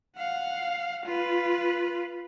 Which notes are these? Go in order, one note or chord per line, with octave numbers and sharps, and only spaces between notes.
F5 F#5
F4 B4